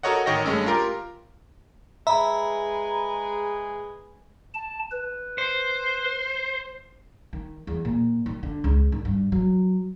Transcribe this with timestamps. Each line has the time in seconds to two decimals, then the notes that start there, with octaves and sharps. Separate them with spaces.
0.03 F#4 A4 A#4 C#5 D#5 F#5
0.26 A1 D#3 C#5 D#5 G5 A#6
0.45 G2 G#3 A3 C#4 E6
0.66 F4 G4 A#4
2.07 G#3 G#4 B4 E5 A#5 B5
4.54 A5
4.92 B4
5.38 C5
7.33 D#3
7.67 E2
7.85 A#2
8.26 D#3
8.43 D3
8.64 C#2
8.92 D#3
9.05 G2
9.32 F#3